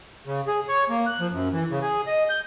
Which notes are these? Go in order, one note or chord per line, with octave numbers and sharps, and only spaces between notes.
C#3
G#4
C#5
A#3
F#6
F3
F#2
E3
C#3
G#4
D#5
G6